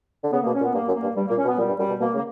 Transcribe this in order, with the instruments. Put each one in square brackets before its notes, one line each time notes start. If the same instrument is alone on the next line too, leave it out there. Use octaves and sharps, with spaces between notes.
[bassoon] D3
[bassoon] C#3 [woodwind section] B3
[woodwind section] A#3
[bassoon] B2
[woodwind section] C#4
[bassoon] A#2
[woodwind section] B3
[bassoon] G2 [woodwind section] A#3
[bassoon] F#2
[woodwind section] A#3
[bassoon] G2
[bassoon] G2 [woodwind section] G3
[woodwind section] A#3
[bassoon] A#2
[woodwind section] C#4
[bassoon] B2
[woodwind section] B3
[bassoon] A#2 [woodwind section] G3
[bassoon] G2
[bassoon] F#2 [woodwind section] G3
[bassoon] B2
[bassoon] B2 [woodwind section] A#3
[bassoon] C#3 [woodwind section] A#3